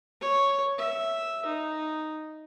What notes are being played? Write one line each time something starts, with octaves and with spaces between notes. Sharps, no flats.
C#5
E5
D#4